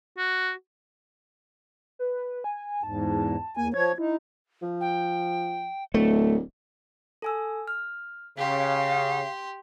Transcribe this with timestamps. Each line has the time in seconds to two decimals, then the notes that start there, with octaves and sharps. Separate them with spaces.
0.18 F#4
1.99 B4
2.44 G#5
2.83 E2 G#2 A5
3.57 E2 A#3 G#5
3.74 F3 C#5 G#6
3.98 D#4 E4
4.62 F3
4.81 G5
5.94 D1 A3
7.22 A4 G#5 E6
7.68 F6
8.38 C#3 G4 F5 C6 B6